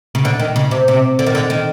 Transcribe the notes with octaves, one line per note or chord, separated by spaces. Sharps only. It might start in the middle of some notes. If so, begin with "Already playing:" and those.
C#3
D3
D#3
C#3
C3
C3
D3
D#3
D3
D#3